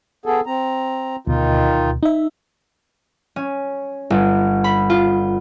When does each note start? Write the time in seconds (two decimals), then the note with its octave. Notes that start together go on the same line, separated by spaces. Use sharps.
0.26 B3 G#4 A4
0.46 C4 A#5
1.27 D2 B2 D#3 D#4 F4
2.03 D#4 E5
3.36 C#4
4.10 G1
4.64 B5
4.90 F4